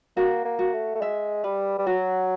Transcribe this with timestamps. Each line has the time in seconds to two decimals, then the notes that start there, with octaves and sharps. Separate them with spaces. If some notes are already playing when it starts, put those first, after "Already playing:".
0.17 A#3 F#4
0.45 A#3
0.59 F#4
0.73 A3
0.95 A3
1.01 G#3 E5
1.44 G3 B4
1.78 G3
1.86 F#3 F#4